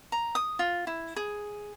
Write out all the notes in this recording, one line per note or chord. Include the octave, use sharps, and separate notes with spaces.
A#5
D#6
F4
E4
G#4